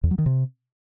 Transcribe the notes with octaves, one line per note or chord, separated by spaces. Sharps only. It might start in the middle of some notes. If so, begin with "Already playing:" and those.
E2
F#3
D#3
C3